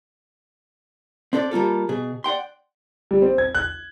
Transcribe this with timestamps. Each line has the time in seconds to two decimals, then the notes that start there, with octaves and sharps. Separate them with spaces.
1.33 C4 D4 A4 C5 D5
1.51 G3 A#3 F4 A4
1.89 B2 G#4
2.24 D5 F#5 G5 C6
3.11 G3
3.22 C4
3.38 G#6
3.55 F#6